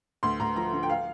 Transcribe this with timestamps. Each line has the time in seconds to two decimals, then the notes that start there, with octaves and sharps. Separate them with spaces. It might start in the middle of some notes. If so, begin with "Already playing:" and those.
0.23 D2 C6
0.40 D2 A#5
0.56 F3 A#5
0.72 D3
0.83 G5
0.90 F5